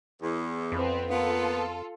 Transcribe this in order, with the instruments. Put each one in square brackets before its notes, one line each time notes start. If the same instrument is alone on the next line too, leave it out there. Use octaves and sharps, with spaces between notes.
[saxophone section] E2
[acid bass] F2 [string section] B3 C4
[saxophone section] A#3 B3 [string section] F4 A4